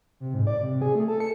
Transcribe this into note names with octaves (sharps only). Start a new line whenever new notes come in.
C3
G#2
D5
C3
G#4
A3
A4
C#7